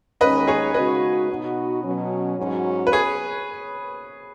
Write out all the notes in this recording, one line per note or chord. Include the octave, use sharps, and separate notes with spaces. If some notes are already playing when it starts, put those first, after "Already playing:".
D#2 D#3 G#3 C#4 B4 D#5
G#4 C#5
C#3 G#3 D#4 F#4 B4 D#5
B2 B3 D#4 F#4
B2 F#3 C#4
G#2 F#3 C#4 F#4
B4
G#4 C#5